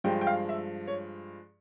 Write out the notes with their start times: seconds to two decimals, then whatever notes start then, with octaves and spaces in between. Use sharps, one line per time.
0.04 G2 F3 G#3 G5
0.21 G5
0.27 F5
0.49 E5
0.87 C#5